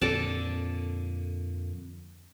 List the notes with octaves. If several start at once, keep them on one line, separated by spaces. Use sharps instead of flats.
F2 A#2 D3 A4 D5 A5